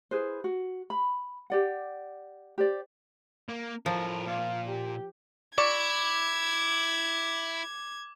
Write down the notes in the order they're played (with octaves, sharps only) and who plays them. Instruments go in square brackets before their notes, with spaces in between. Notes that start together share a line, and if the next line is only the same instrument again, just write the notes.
[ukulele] E4 G#4 B4 C5
F#4
B5
G4 D5 F#5
G4 C5 D5
[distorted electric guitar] A#3
[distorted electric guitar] A2 A#4 [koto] F3
[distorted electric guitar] A#2 F4 [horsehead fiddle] F5
[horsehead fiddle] G4
[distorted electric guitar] E4 [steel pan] D5 C#6 [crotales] D6 [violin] G#6